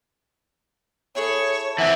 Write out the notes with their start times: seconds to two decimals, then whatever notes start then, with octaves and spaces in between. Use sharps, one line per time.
1.15 E4 G#4 A4 C#5
1.78 E3 C4 E5 F#5 G#5